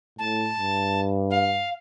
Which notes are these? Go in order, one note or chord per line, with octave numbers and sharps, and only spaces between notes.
A2 A5
G2
F5